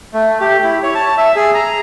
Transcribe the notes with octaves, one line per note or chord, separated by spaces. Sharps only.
A3
G4
E4
C#5
A5
E5
G#4
A#5